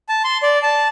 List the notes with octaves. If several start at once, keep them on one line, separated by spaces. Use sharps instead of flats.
A5
C6
D5
A5